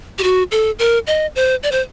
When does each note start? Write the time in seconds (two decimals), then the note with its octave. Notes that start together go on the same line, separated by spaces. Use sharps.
0.19 G4
0.23 F#4
0.51 A4
0.79 A#4
1.07 D#5
1.36 C5
1.63 D5
1.72 C5